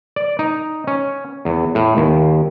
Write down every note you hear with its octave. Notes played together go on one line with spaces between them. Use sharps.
D5
D#4
C#4
E2
A2
D#2